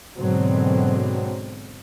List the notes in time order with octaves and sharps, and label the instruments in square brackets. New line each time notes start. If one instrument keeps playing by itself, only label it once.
[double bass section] G#2 B2 D3 F#3 C4